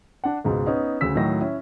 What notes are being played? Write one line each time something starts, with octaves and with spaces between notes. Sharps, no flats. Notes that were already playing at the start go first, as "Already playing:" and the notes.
D4 F#5
C#2 G#2 B2
B3 C#4 D#4
D2 C#3 E6 B6
A2 D#3 F#3 D#5 A#6
C#4 E4